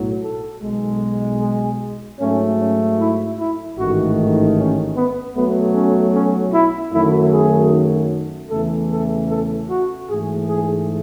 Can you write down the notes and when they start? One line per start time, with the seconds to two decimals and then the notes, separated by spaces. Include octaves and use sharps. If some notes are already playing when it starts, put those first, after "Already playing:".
Already playing: B1 A2 F#3
0.23 A4
0.62 B1 B2 G#3
1.42 G#4
2.20 G#2 F#3 A3 C#4
2.60 C#4
2.99 E4
3.39 E4
3.78 A1 G#2 D#3 A3 F#4
4.57 C#4
4.97 B3
5.35 B1 B2 F#3 A3 B3
5.75 C#4
6.14 C#4
6.54 E4
6.93 F#2 D#3 F#3 A3 E4
7.32 G#4
8.51 E2 C#3 E3 A3 A4
8.91 A4
9.29 A4
9.69 F#4
10.08 G#2 E3 A3 G#4
10.49 G#4